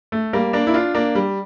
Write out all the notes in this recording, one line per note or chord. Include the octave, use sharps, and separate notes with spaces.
A3
G3 A#3
A#3 D4
E4
D4 F4
A#3 D4
G3